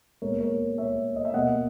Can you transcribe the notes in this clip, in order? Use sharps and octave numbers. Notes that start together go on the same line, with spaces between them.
A#2 G#3 B3 A#4 C#5
A#4 C#5
C#5 E5
D#5
E5
B2 A#3 D#5 F#5